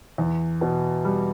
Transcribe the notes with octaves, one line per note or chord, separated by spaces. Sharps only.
E2
B2
G3